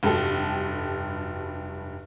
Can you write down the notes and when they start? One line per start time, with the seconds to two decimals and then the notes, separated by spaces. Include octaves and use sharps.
0.03 F1 G2 F#3 G4 A4